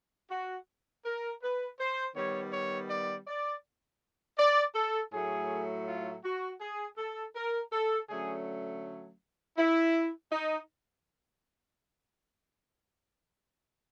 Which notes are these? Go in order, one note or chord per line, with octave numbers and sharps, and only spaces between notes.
F#4
A#4
B4
C5
D#3 G3 B3 C#5
C#5
D5
D5
D5
A4
A2 F#3 A3 G#4
F4
F#4
G#4
A4
A#4
A4
D3 F#3 A3 C#4 G#4
E4
D#4